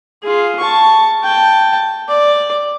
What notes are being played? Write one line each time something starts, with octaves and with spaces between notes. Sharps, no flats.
F4 G#4
A5 C#6
G5 A5
D5